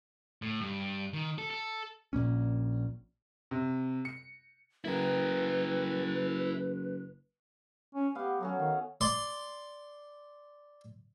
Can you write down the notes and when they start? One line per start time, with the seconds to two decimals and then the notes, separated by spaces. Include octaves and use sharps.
0.42 A2
0.61 G2
1.13 D#3
1.38 A4
1.50 A4
2.13 A#1 A#2 A#3 C#4
3.51 C3
4.05 C#7
4.85 F#1 E4 A#4 B4
7.95 C#4
8.15 B3 G4 F5
8.41 F#3 C#4 F#4 A4
8.59 D#3 F5
9.01 D5 C6